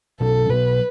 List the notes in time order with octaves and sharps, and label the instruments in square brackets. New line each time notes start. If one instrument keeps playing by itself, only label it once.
[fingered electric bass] B2 F#3 C#4 [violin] A4
[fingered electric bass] B2 F#3 B3 [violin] B4